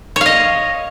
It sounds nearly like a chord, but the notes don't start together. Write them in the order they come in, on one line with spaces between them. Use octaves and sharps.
C#5 F5 D#5